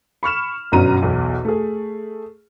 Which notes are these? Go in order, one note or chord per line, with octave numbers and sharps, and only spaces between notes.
B5 C#6 F6 E7
G1 F#2 B2 F#3 A#5 D#7
B1 E2
A3 G#4